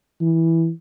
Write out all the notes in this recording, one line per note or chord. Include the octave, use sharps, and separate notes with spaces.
E3